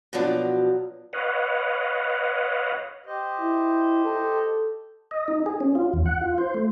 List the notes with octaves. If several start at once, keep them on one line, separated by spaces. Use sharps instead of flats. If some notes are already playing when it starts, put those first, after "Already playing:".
B2 F3 F#3 D4
B4 C#5 D#5 F5 F#5
G4 C5 D#5
E4
A4
D#5
D#4
G#4
C#4
F4
E2
F#5
F4
C5
A3